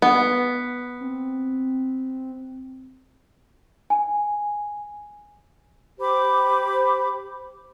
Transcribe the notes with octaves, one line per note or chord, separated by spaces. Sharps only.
B3
C4
G#5
G4 C5 B5 D6